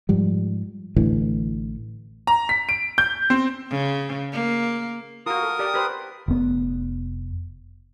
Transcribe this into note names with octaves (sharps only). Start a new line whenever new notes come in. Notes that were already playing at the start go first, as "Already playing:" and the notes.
G#2 F3 G3
A1 A2 D3 E3
A#5
B6
D7
G6
C4
C#3
A#3
F4 F#4 A#4 D#6
A4
G4 D5 G5
G4 B4 C5
F1 B3